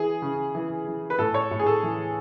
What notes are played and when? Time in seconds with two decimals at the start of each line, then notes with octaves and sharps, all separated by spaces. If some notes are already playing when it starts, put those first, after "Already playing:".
Already playing: E3 G#4
0.22 C#3
0.55 E3
0.87 E3
1.10 B4
1.19 A2 A4
1.34 C#5
1.51 A2
1.59 G#4
1.67 A4
1.83 E3